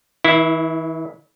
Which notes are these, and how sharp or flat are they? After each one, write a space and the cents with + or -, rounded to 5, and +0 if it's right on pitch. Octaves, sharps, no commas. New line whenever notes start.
E3 -45 E4 +0